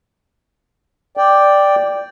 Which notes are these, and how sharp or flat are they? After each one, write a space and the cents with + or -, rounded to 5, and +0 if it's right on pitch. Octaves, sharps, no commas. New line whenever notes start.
D5 +0 G5 +0